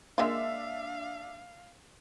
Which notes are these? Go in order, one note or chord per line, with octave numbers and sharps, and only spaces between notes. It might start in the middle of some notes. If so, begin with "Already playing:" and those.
G#3 A#3 D4 F4 A#4 E5 F5